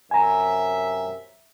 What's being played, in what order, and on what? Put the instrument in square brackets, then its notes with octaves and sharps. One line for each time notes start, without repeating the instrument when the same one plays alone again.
[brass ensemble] F#2 C3 E5 [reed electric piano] G#5 A#5